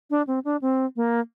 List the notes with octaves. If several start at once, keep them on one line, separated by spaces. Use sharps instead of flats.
D4
C4
D4
C4
A#3